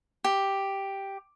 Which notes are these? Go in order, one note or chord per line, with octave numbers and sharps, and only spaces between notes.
G4